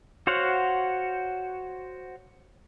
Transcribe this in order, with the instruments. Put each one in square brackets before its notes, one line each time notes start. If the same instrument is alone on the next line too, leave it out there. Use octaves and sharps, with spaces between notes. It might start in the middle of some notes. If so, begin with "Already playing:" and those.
[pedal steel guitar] F#4 C5 C#5 F5 F#5